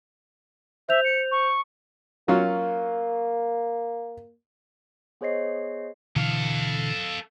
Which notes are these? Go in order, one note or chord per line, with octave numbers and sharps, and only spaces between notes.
C5 E5 G6 F7
C#7
C#6
F#3 A#3 C#4 F4
B3 G#4 C5 C#5 D#5 C7
B2 D3 E3 A4 F5